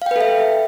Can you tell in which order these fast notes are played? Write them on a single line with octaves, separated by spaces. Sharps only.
F5 G5 B4 A4 E5